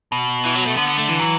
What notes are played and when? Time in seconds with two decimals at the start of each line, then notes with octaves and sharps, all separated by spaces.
0.12 B2
0.45 E3
0.55 F#3
0.66 A3
0.77 D3 B3
0.88 B3
0.99 A3
1.09 E3
1.20 F#3